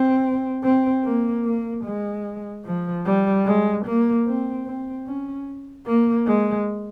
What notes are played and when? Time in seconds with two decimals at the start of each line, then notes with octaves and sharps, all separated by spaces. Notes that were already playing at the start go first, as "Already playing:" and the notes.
Already playing: C4
0.64 C4
1.05 A#3
1.45 A#3
1.85 G#3
2.65 F3
3.05 G3
3.46 G#3
3.86 A#3
4.27 C4
4.66 C4
5.07 C#4
5.87 A#3
6.27 G#3